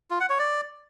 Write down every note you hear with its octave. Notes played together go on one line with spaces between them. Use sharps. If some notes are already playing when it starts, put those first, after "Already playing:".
F4
F#5
C#5
D5